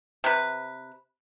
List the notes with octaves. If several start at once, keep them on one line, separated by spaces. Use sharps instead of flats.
C3 B4